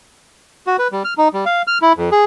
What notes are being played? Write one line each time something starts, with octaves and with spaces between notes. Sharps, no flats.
F#4
B4
G3
F6
D#4
G3
F5
F6
E4
F2
G#4